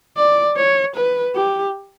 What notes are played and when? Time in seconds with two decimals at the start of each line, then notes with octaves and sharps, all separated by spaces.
0.17 D5
0.57 C#5
0.96 B4
1.35 G4